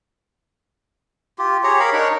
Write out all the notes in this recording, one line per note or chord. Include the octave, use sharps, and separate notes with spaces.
F4 G4
G4 G#4 C#5 A#5
A#4 F5 B5
D4 D#4 A#4 C#5